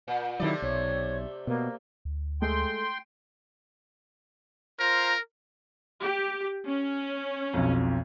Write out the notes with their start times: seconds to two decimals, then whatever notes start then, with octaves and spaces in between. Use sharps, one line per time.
0.08 A#2
0.40 C3 D#3 F#3 A3 E4 D5
0.62 B1 C#5
1.47 B2 A#3
2.05 D2
2.42 G#3 A3 G5 C6
4.79 F4 A#4 C5 A#5
6.04 G4
6.66 C#4
7.54 B1 F2